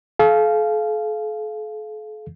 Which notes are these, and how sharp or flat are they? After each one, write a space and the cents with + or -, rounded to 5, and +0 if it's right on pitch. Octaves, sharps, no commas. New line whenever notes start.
A4 -45 F5 -10